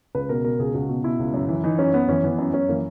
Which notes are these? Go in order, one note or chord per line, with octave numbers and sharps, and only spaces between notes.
C#2 B4
B2 A#4
B2 A#4
C#2 G#4
C#2 F#4
B2
B2 E4
C#2
F#2
E3
E3 D#4
F#2 C#4
F#2 B3
E3 C#4
E3 B3
F#2
F#2 C#4
E3 A#3